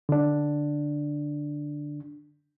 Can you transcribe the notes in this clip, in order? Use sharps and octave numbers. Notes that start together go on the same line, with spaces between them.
D3 D4